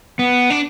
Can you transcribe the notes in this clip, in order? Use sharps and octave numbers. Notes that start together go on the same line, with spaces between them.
B3
D4